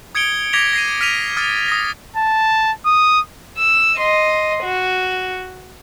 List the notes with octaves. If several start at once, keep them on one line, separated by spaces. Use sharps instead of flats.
D#6 G#6 C#7 D7 G7
D6 G#6 A#6 B6 F7 G7
A#6 C7 D#7
F6 B6 D#7 F7
D#6 F6 A6
D#6 A#6
A5
D#6
E6
D#5 C6
F#4